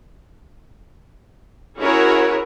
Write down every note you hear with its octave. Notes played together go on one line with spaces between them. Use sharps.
C#4 E4 F#4 G#4 A#4 C#5